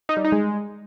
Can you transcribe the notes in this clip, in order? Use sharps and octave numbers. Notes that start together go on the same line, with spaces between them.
D#4
G3
D#4
G#3